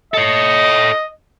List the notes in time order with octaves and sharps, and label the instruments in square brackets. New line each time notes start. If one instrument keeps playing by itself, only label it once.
[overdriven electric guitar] A4 C#5 [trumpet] D#5